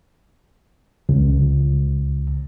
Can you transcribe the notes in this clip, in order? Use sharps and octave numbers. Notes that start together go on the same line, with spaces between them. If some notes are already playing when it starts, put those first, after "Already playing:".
C#2